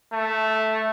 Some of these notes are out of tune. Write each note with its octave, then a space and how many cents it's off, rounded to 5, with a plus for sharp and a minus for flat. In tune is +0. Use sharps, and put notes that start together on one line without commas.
A3 -5